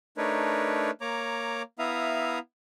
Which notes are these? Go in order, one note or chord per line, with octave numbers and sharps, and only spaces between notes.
A3 D4 D#4 A#4 B4 C#5
A#3 C#5 A#5 D6
B3 E4 E5 F5 A#5 D#6